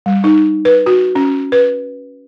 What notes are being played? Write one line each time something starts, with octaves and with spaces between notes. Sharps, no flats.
G3
D#4
B4
F#4
C#4
B4